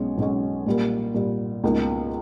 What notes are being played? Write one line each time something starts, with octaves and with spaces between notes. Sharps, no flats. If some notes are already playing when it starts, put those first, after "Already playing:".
Already playing: B1 B2 G#3 C#4
B1 B2 G#3 C#4
A#2 G3 A#3
A#2 G3 A#3
C#2 B2 A#3 D#4